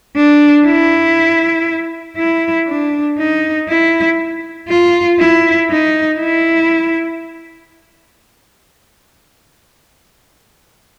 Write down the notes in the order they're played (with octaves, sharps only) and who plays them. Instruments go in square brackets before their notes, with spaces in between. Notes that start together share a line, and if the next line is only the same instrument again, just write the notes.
[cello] D4
E4
E4
D4
D#4
E4
F4
E4
D#4
E4